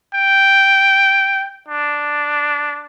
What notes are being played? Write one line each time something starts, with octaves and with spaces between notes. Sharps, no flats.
G5
D4